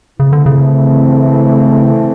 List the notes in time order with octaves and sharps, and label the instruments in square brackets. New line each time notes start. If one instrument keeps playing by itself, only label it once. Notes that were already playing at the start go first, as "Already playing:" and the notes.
[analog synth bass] C#3 [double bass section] E3 A3 C4
[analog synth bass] D3
C#3